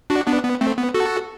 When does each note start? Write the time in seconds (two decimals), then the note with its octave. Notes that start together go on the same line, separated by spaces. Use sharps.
0.10 D4 F#4
0.27 B3 D4
0.44 B3
0.61 A3 C4
0.78 B3
0.94 F#4 A4